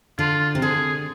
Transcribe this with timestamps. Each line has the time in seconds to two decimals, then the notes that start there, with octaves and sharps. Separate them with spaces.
0.19 D3 F4
0.55 C3
0.62 D3 G#4